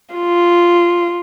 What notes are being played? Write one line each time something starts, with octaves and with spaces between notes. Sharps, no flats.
F4